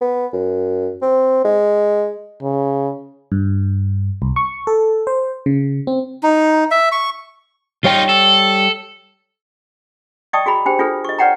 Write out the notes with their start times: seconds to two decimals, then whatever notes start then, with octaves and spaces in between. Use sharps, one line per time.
0.01 B3
0.33 F#2
1.02 C4
1.44 G#3
2.42 C#3
3.32 G2
4.22 C2
4.36 C#6
4.67 A4
5.07 C5
5.46 C#3
5.87 C4
6.23 D#4
6.71 E5
6.92 C#6
7.84 G3 D#4 F4 C#5 G5
8.09 A4
10.33 D5 D#5 G5 A5 C#6 D#6
10.46 F#4 G#4 A#5 B5
10.66 D4 G4 C5 G5
10.79 D4 F4 G#4 A4 B4
11.04 D#5 C#6
11.18 B4 C#5 D5 F#5 G5 A#5